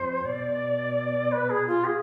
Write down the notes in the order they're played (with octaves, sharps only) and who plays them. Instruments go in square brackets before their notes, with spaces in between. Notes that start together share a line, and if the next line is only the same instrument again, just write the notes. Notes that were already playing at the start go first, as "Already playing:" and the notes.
Already playing: [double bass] F2 [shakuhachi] C5
[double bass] B2 [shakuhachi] D5
[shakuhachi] B4
G#4
F4
G#4